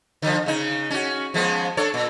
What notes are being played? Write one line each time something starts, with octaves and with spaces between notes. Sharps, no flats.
D3 F3
C#3 D#4
C#4 F#4
F3 G#3 B3
D4 A4 C#5
A#2